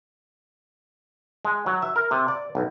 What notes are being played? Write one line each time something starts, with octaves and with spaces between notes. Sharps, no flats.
G#3
F#3
E5
A#4
C3
D5
B1